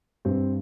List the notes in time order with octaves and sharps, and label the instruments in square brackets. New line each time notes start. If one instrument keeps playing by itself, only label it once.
[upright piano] G2 [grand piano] C4